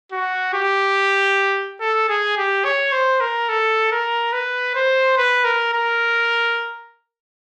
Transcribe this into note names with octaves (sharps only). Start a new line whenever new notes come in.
F#4
G4
A4
G#4
G4
C#5
C5
A#4
A4
A#4
B4
C5
B4
A#4
A#4